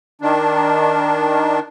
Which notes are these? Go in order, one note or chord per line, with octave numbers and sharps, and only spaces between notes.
D#3 D4